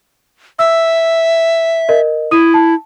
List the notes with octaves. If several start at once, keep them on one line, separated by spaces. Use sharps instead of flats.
E5 E6
A#4 D#5
E4 D#6 D#7
A5